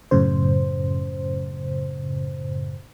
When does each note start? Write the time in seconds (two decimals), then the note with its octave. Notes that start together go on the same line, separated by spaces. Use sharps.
0.11 F#2 A2 C#3 C5